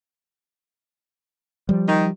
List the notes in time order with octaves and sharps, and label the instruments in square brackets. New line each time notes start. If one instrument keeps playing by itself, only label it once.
[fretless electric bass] F3 G3
[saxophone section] D#3 D#4